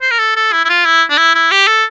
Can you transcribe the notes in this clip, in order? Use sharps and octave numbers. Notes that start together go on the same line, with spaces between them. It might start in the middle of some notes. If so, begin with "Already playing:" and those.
C5
A#4
A4
A4
E4
E4
F4
E4
D4
E4
E4
G4
A4